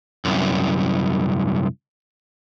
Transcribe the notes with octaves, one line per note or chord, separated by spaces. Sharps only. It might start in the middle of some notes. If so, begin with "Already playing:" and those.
C2 F#2